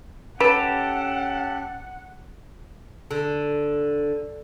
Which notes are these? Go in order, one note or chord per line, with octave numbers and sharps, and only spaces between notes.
C#4 G4 A4 B4 F#5
D3